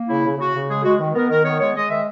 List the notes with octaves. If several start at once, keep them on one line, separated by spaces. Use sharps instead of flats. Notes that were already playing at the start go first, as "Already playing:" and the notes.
Already playing: A#3
C#3 E4
C#3
C#3 F#4
C#3
G#3 G#4
G#3 F#4
D#3
B3 A#4
D#3 A#4
B3 C#5
G#3 C#5
G#3 D#5
D#3 E5